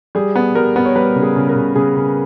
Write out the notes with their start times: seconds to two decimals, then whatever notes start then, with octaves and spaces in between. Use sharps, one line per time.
0.15 G3 G#4
0.35 B3
0.55 G3 A#4
0.76 B3
0.85 C#5
0.95 G3 B4
1.16 C#3
1.23 G#4
1.36 C#3
1.49 A#4
1.56 C#3
1.75 C#3 G#4
1.96 C#3